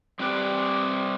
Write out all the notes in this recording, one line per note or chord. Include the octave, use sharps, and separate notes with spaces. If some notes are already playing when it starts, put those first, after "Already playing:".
G3 C4 G4 B4 C5 D5